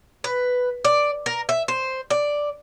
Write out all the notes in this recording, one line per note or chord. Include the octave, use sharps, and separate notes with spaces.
B4
D5
A#4
E5
C5
D5